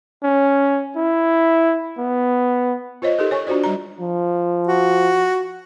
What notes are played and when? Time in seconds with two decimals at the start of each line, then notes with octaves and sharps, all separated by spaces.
0.23 C#4
0.96 E4
1.98 B3
3.02 F4 C5 C#5 D#5
3.19 D#4 G4 A4 A#4
3.31 C#5 G#5 C#6
3.47 D4 F4 F#4 C5 D5
3.64 G3 A#5
4.00 F3
4.67 F#4